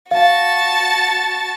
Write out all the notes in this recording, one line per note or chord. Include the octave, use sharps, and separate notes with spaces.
F#4 F5 A5